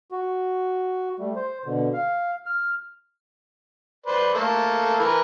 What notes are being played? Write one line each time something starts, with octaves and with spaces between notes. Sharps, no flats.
F#4
G3 A3
C5
B2 D3
F5
F6
B4 C5 D5
A3 A#3 A4
E3 A#4 B4